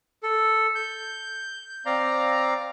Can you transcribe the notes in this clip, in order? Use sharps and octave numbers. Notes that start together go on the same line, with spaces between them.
A4
G6
C4 D5 F5 A#5